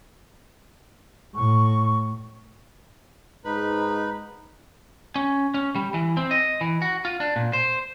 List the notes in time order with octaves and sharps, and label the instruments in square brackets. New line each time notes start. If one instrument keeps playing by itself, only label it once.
[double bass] A2 [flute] C#6
[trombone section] G#2 [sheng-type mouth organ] D#4 B4 B5
[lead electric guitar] C#4
C#4
G3
E3
C4
D#5
E3
F#4
F4
D4
A#2
C5